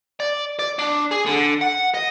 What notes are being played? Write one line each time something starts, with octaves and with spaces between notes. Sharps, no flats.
D5
D5
D4
G#4
D3
F#5
D#5